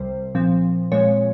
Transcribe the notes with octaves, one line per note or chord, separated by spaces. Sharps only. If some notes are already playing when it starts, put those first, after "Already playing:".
Already playing: C2 C3 G3 C5
A#2 F3 C4
A#2 F3 G#3 C4 C#5